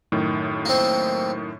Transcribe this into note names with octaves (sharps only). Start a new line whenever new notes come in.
F#2 A2 D#3
A#3 C4